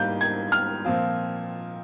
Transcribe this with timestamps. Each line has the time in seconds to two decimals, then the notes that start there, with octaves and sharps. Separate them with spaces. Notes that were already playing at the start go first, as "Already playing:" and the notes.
Already playing: G#2 G3 A#3 F4 G6
0.21 G#6
0.52 F6
0.84 A#2 F3 C4 F4